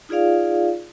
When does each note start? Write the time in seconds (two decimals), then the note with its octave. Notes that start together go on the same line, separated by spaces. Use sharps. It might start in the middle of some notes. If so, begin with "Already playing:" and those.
0.09 D#4 F4 G#4 D5 F5